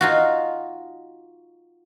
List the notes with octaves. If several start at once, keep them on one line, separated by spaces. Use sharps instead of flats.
D#4 F4 F#4